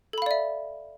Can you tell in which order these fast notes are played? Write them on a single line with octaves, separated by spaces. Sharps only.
A4 B5 F5 D5 E5